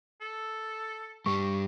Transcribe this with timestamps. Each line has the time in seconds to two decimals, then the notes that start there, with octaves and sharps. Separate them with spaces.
0.22 A4
1.26 G2 G3 C#6